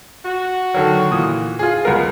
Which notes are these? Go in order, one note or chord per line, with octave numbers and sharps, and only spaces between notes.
F#4
D3 D#3 F#3
A#2 E3 D#6
F4 G#4
C#2 B3 A#4